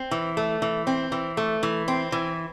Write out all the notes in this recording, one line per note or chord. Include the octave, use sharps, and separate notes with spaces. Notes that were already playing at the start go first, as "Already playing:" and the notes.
Already playing: C4
E3
A3
E3
C4
E3
A3
E3
C4
E3